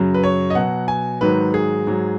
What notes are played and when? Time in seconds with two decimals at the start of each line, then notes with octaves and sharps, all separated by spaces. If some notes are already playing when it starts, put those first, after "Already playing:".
Already playing: F#2 C#3 F#3
0.14 B4
0.24 C#5
0.50 D#5
0.55 B2 F#3 F#5
0.88 G#5
1.21 G#2 D#3 F#3 B4
1.54 G#4
1.87 G#2 F#3